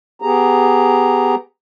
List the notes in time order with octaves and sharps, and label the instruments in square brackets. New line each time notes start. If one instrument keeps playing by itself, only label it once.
[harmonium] B3 G4 G#4 A#5